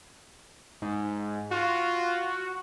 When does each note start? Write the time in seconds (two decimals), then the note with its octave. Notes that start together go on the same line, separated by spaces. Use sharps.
0.82 G#2
1.51 F4 F#4